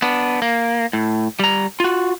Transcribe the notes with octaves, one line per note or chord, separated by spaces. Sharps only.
B3 D4
A#3
A2
G3 A#5
F4 F#4